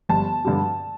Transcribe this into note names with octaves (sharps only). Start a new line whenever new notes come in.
G1 A5
G2 D3 G3